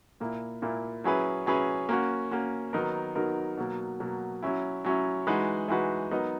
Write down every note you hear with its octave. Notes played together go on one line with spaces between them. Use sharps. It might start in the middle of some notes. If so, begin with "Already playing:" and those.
A#2 A#3 E4
A#2 A#3 E4
F#3 C#4 E4 G#4 B4
F#3 C#4 E4 G#4 B4
A#3 C#4 F#4
A#3 C#4 F#4
D#3 F#3 B3 D#4 A#4
D#3 F#3 B3 D#4 A#4
B2 F#3 A#3
B2 F#3 A#3
F#3 C#4 E4
F#3 C#4 E4
E3 G#3 D#4 F#4 B4
E3 G#3 D#4 F#4 B4
F#3 B3 D#4 A#4 D#5